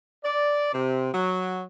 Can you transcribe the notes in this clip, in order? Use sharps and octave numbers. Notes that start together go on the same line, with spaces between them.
D5
C3
F#3